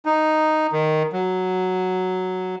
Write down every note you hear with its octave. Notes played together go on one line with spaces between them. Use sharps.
D#4
D#3
F#3